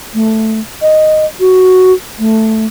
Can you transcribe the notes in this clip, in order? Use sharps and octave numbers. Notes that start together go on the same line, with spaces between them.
A3
D#5
F#4
A3